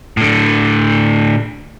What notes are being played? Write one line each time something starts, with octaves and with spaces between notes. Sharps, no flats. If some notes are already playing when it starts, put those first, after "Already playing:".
A2 D3